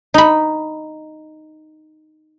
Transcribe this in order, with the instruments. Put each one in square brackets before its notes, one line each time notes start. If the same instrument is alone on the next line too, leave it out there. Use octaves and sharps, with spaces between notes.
[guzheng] D#4 B5